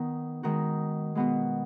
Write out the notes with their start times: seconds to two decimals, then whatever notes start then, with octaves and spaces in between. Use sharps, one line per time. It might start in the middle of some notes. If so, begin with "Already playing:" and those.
Already playing: D#3 B3 D#4
0.43 D#3 G#3 D#4 F#4
1.15 B2 G#3 B3 F#4